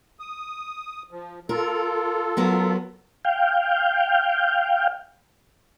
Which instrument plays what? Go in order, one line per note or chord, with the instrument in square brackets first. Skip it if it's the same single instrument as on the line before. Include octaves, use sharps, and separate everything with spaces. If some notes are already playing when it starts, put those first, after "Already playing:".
[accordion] D#6
F3
[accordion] F4 A4 [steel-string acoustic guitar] A#4
[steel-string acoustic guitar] F#3 B3 A#4
[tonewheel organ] F5 G5